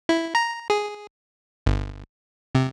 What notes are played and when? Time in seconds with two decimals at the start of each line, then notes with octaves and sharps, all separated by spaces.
0.09 E4
0.35 A#5
0.70 G#4
1.66 G1
2.55 C3